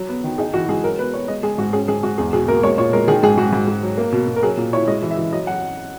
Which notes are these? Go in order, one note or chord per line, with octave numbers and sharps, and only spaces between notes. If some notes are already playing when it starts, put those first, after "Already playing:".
Already playing: F#3
B3
D#3
D#4 G#4
E3 F#4
G#3 G#4
F#3 A#4
B3 B4
B3 C#5
G#3 D#5
G#3 G#4
G#2 F#4
C#4 G#4
G#2 G#4
G#2 F#4
E2 G#4
B2 G#4
A#3 A#4
G#3 C#5
A#2 C#5
G#3 A#4
D#3 G#4
G#2 G#4
G#2 F#4
G#2
G#2
F#3
A#3
B2
B2
A#4
F#3 G#4
A#2
E4 C#5
G#3 D#5
E3
E5
E3
F#3 D#5
F#3 F#5